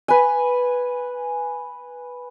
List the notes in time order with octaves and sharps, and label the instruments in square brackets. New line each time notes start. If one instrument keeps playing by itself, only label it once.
[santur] B4 G#5